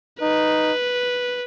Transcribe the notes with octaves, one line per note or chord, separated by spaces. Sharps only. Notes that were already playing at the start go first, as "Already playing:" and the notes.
D#4 B4